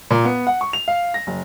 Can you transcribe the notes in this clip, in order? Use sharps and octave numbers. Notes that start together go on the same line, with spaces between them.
A#2
B3
F#5
C#6
F7
F5
A#6
F#1